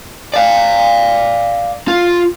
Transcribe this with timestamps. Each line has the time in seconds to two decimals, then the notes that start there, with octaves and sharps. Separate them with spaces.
0.34 D5 F5
1.88 F4